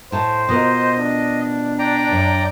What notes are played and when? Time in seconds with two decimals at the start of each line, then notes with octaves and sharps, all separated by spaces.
0.12 A2 C5 A5
0.49 B2 F4 A#4 D#5
0.99 D4
1.79 D5 G5 A#5
2.11 F#2